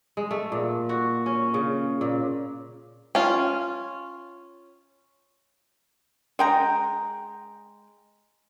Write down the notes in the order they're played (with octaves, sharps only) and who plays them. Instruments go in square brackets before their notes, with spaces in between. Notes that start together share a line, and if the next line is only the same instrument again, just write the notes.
[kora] G#3
A3
A#2
F#4
C#4
C#3
A#2
[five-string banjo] C#4 F4
[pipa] G#3 G5 A#5